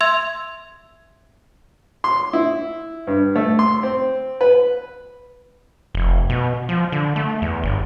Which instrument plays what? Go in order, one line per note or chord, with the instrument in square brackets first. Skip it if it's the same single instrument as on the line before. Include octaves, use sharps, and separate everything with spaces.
[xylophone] E5 C6 E6 G#6
[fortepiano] C6
E4
G2
A3
C6
C4
B4
[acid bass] F1
B2
F3
D3
A3
E2
G1